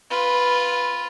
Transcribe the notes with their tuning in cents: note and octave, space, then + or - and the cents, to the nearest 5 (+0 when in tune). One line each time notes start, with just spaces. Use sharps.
F4 +0 B4 -5